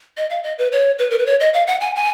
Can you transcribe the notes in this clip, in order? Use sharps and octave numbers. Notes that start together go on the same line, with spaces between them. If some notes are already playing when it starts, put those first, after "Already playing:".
D#5
F5
D#5
B4
C#5
B4
A#4
B4
C#5
D#5
F5
F#5
G#5
G#5